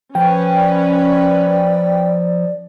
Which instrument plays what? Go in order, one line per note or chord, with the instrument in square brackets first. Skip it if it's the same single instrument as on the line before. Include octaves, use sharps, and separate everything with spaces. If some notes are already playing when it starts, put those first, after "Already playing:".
[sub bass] F3 [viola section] C#4 B4 [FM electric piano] G5
[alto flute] D5